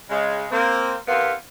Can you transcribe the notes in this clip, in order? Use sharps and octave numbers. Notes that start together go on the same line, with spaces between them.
C#3 G#3
A#3 C4
E2 C3 B3 C4 A#4 F5